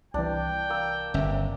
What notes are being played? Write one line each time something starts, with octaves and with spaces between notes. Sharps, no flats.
C2 E3 D4 G5
A#3 E6
G1 C#4 E5